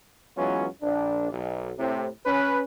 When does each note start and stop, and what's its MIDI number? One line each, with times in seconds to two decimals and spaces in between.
0.37 0.67 52
0.37 0.67 54
0.37 0.67 56
0.37 0.67 59
0.37 0.67 61
0.37 0.67 65
0.82 1.28 34
0.82 1.28 62
1.31 1.72 35
1.79 2.08 45
1.79 2.08 48
2.26 2.61 61
2.26 2.61 71